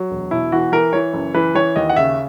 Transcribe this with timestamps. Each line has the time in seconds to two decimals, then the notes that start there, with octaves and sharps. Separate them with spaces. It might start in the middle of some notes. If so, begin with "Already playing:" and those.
Already playing: F#3
0.11 E1
0.31 B2 E4
0.52 E3 F#4
0.72 E3 A#4
0.93 E3 C#5
1.13 F#1
1.34 E3 B4
1.55 E3 C#5
1.76 D#2 D#5
1.89 F#5
1.96 C#3 E5